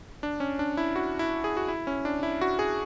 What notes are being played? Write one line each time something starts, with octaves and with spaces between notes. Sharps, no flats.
D4
C#4
D4
E4
F#4
E4
G#4
F#4
E4
C#4
D4
E4
F#4
G#4